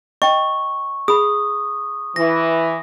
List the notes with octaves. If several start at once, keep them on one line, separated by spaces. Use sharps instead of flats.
D#5 G5 C#6
G#4 B5 D#6
E3 A#6